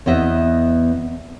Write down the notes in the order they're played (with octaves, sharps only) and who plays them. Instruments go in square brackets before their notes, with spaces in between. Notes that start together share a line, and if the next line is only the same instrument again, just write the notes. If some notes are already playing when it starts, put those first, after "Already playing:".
[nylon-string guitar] E2 B3 D#5 E5